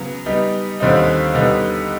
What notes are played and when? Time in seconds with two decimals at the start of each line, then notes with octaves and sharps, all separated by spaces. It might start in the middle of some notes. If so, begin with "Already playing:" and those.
Already playing: C#3 F#3 B3
0.26 G3 B3 D#4
0.80 D#2 D3 G3 C4 D#4
1.35 D3 G3 B3 D#4